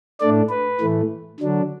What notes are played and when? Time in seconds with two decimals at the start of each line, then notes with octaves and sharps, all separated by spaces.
0.20 A2 A3 D4 D5
0.49 B4
0.80 A2 E3 A3
1.40 D3 F#3 D4